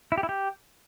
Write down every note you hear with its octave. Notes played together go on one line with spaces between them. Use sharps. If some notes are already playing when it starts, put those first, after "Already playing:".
E4
G4
E4
G4